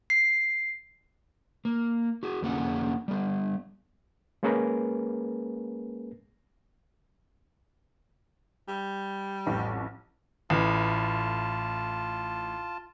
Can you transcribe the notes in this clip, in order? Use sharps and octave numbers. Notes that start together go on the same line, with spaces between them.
C7
A#3
F#4 G#4
F2 D3 A#3 C#4 G#4 F#5
G3 B3
G#3 A#3 C#4 G#4 A#4 B4
G3
A1 F2
A1 A2 F4 A5